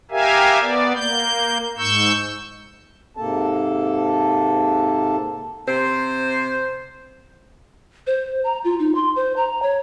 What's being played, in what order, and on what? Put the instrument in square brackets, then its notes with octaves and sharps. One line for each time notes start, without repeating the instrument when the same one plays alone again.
[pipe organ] G4 A#4 E5 F5 G#5
B3 D5
A#3 G6
G#2 C#6 E6 G6
[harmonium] G#2 C3 A#3 A4 A5
[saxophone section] C3 C5
[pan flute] C5
A#5
F4
D#4
C6
C5
A#5
C#5